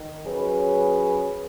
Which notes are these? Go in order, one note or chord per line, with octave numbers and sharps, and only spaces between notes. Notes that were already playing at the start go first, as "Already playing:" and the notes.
Already playing: D#3
F#3 C#4 G#4 B4